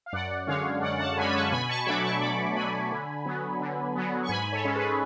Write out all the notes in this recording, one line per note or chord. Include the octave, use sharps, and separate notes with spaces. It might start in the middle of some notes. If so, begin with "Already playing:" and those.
F5
F#2 D5 F#5
D3 G#3 C#4 C#5 F5
F#2 D5 F#5
F#5 A5
D3 G#3 C#4 G#5 B5
B5
A5 C#6
B2 G#5 B5
A5 C#6
F#3 A3 D4 B5 D6
A5 C#6
B2 B5 D6
F#3 A3 D4 G#5 B5
D3
F#3 B3
D3
F#3 B3
C#6
G#2 G#5 B5
A4 C#5
G#3 C#4
A4
G#4 B4